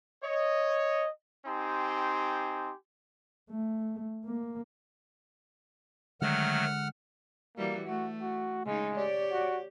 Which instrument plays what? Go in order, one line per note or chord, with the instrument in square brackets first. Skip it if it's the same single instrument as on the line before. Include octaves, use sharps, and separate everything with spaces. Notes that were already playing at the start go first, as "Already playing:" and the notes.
[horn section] C#5 D#5
C4 D#4 G4 G#5 C6
[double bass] A3
A#3
[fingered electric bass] D3 G#3 [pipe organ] D#3 F#3 A3 [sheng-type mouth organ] F#5 F6
[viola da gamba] E3 G3 F#4 [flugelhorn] A#3
[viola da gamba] A3 [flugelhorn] F#4
[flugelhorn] F#4
[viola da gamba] C#3 D#4 [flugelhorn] G#3
[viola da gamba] G4 [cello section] C#5 D5
[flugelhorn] F#4